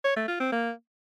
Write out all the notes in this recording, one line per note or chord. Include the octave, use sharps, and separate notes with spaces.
C#5
A3
F4
C4
A#3